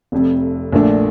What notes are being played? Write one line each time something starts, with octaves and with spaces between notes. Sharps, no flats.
F1 F2 C3
A#1 A#2 A3 D4